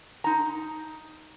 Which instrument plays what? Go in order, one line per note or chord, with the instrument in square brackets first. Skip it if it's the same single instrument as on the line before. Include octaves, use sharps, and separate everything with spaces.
[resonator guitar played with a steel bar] D#4 A#5